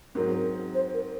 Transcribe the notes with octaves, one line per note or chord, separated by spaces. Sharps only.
G#2 F#3 C4 A#4
C5
A#4